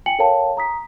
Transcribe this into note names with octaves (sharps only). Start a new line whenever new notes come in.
G5 G#5 C#7 F#7
A4 A#4 C#5 F5 G5 A5
A#5 D#6 B6